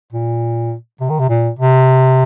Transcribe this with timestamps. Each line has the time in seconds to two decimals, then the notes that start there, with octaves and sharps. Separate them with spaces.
0.13 A#2
1.01 C3
1.09 D#3
1.19 C3
1.29 A#2
1.59 C3